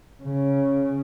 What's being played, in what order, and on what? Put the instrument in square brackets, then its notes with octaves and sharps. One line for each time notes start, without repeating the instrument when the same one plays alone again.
[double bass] C#3